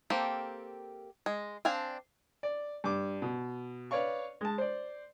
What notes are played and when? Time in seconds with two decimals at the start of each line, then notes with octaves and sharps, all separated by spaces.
0.10 A#3 C4 G4 A4
1.26 G#3
1.65 C4 D4 F5 G#5
2.43 D5
2.84 G2 D6
3.22 B2
3.91 B4 C#5 D5 F5 C#6
4.41 G#3 A5
4.58 C5 D5